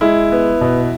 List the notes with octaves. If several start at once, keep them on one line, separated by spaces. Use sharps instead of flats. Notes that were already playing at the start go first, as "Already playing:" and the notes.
G#3 E4
B3
B2